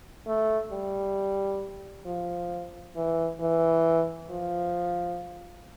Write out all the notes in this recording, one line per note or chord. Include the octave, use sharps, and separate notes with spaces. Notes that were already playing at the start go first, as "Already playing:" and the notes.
A3
G3
F3
E3
E3
F3